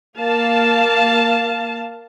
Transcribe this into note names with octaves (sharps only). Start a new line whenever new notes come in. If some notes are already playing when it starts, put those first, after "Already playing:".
A#3 F5 A5